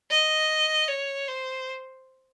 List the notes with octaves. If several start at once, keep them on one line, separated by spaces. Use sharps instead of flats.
D#5
C#5
C5